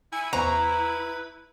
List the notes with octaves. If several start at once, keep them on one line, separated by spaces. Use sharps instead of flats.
E4 G#5 E6 C#7 D#7
E2 B4 C5 A#5 C#6